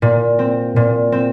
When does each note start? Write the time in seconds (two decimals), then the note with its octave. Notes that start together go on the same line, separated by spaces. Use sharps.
0.02 A#2
0.39 C4
0.76 A#2
1.12 C4